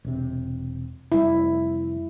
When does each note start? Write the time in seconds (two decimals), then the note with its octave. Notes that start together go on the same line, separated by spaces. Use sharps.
0.04 E1 C3
1.12 F1 G3 E4